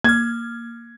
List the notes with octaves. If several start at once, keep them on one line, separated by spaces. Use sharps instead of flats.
A#3 F6 G#6